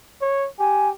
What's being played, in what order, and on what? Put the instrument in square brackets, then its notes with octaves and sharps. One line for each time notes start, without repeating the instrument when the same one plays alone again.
[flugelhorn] C#5
[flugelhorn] G4 [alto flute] G#5